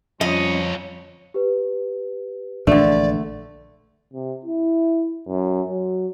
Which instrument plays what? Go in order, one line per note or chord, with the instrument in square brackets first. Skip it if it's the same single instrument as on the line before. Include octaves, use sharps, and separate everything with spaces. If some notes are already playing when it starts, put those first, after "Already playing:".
[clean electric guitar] F2 [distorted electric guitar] F3 C#5 [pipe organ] G3 C#4 F4 [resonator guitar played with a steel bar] D#5
[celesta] G4 B4
[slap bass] A#1 E3 D4 [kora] D3 A3 [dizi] D5
[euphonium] C3
E4
F#2
F#3